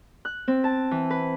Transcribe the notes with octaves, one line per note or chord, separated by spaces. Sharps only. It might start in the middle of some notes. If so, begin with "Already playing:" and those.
F#6
C4
A5
E3
B4